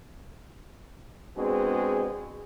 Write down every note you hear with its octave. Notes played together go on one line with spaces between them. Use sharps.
G#3 B3 C4 D4 F#4 G#4